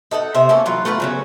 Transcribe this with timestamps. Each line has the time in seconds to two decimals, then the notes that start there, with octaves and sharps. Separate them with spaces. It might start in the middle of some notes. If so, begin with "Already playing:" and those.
0.11 D#4 A4 D#5 F#5
0.35 C3 C5 E5
0.49 A#3 C#4 A4
0.66 E3 F#3 F4
0.85 A3 F4 B4 F#5
1.00 C#3 F#3 C#4